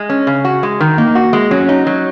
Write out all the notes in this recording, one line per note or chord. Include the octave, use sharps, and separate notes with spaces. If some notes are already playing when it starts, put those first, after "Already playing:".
Already playing: G#3
C#4
C#3
F#4
G#3
D#3
A#3 D#4
F#4
G#3
F#3 C#4
D#4
F#3